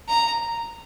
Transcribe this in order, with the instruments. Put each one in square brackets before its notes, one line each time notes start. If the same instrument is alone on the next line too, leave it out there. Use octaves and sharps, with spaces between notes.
[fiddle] A#5